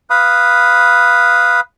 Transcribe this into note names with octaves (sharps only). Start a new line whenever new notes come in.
B4 F5 B5 D#6